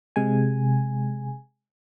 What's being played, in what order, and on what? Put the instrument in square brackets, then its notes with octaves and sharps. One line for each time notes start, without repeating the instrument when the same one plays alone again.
[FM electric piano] C3 G#3 G#5